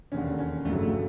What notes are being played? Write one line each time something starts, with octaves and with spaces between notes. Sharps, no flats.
E1 D#2 D3 C#4
C#4
G1 F2 C#3 F#3 A3
A3